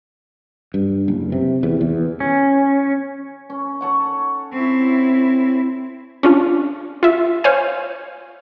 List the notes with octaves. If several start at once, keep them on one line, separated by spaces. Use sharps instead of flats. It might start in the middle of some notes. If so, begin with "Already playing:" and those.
G2
F#1
C3
E2
E2
C#4
C#4
A4 C#5 F#5
C4 E4
C#4 D4 F4
F4 E5
C5 C#5 F5 G#5